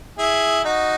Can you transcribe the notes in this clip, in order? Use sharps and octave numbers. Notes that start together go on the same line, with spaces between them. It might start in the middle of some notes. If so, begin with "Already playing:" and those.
E4 G#4
D#4 F#4